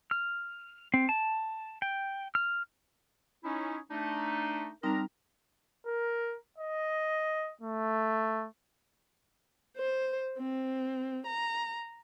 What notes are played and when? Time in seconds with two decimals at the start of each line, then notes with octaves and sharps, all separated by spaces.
0.11 F6
0.94 C4
1.09 A5
1.82 G5
2.35 F6
3.43 C#4 D#4 E4
3.91 A3 D4 D#4
4.83 G3 C4 D4 D#4 A#4 A#5
5.86 A#4
6.58 D#5
7.61 A3
9.77 C5
10.38 C4
11.26 A#5